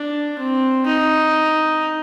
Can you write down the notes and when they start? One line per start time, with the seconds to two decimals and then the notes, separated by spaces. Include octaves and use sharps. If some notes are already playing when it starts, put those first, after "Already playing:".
Already playing: D4
0.38 C4
0.86 D#4